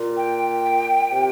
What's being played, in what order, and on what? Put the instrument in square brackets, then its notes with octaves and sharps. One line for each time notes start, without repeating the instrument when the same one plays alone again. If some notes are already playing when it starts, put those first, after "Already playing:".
Already playing: [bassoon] A#2
[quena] G5
[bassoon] C3